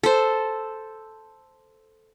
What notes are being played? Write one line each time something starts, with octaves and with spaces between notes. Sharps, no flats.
A4 C5